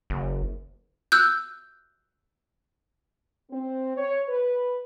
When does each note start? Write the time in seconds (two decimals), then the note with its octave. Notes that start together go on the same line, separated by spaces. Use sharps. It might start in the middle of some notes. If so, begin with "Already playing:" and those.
0.10 F#1
1.12 E6 F#6 G6
3.51 C4
3.95 C#5
4.28 B4